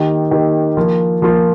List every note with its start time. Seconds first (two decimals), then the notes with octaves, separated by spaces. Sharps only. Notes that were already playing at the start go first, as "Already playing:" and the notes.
Already playing: D#3 A#3 D#4 G4
0.31 D#3 A#3 D#4 G4
0.77 F3 A#3 F4
1.22 F3 A#3 F4